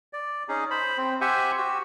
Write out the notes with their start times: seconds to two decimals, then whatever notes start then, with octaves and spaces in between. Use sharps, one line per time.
0.13 D5
0.49 C#4 D#4 G#4
0.70 C5 B5
0.98 C4
1.21 G4 C5 E5 F#5 G#5
1.58 F#4 G4 E6